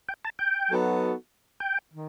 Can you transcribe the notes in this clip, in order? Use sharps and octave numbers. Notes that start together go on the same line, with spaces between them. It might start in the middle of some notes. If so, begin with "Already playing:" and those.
G5
A5
G5
F#3 B3 D#4 F#4 A4
G5
D#3